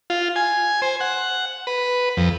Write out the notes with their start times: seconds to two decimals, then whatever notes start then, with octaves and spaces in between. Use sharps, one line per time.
0.10 F4
0.36 G#5
0.82 C5
1.00 F#5
1.67 B4
2.17 F2